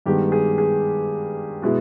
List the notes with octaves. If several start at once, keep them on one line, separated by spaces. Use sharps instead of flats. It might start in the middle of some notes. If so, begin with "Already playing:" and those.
G2 D#3 G#3 B3 G4
G#4
G#4
B2 G#3 B3 E4